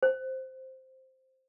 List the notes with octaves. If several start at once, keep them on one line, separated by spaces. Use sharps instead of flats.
C5